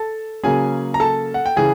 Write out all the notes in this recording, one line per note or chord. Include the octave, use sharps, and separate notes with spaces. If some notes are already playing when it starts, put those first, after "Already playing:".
Already playing: A4 A5
C#3 F#3 A#3 C#4 G#4 G#5
A#5
A4 A5
F#5
G5
C#3 E3 G#4 G#5